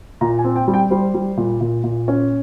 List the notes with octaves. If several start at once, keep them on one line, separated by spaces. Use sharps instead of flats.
A#2 A#5
G#5
C4
G5
G3
G5
G3 C5
G3
A#2
A#2
A#2
C#4